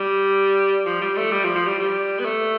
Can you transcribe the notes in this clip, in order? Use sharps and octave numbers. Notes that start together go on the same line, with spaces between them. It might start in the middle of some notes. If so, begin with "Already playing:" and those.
Already playing: G3
F3
G3
A3
G3
F3
F3
G3
G3
B3
A3